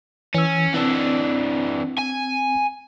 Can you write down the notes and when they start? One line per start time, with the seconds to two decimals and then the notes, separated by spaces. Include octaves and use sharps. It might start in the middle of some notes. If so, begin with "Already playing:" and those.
0.34 E3 C#4 E6
0.74 E3 C4 D4 E6
1.98 G#5